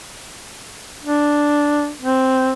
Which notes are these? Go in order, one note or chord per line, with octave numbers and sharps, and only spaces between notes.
D4
C4